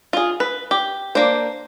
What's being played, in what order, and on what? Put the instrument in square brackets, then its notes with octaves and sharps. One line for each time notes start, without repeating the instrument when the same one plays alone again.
[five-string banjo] F4 G#4
B4
G4
A#3 D4 C5